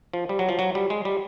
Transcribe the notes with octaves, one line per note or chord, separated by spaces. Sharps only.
F3
G3
F#3
F3
F#3
G3
G#3
G3